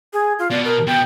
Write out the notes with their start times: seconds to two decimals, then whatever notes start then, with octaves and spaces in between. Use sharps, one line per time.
0.13 G#4
0.39 F4
0.51 B2 D5
0.64 A#4
0.87 B2 G5